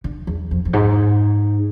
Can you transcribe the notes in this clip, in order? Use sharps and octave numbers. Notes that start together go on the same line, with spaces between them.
D3
E2
F2
F2
G#2